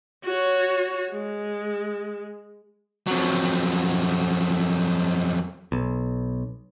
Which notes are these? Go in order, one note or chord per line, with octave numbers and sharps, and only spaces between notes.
F#4 C#5
G#3
F2 F#3
B1